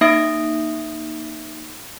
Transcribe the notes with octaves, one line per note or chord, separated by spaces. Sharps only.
A#3 D#4 E5 D#6 A#6 D7